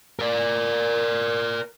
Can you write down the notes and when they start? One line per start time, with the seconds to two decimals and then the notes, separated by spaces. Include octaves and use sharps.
0.19 A#4 D5